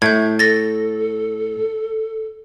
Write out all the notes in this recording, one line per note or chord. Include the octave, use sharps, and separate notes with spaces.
A2 E5 G6 G#6
A4 A6 A#6